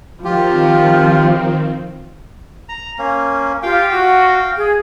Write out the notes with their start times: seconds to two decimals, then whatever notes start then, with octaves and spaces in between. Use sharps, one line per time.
0.24 D#3 F3 C4 F4 G4
2.69 A#5
2.98 A#3 C#4
3.63 F4 G4 F5 G5
3.90 F#4
4.57 G#4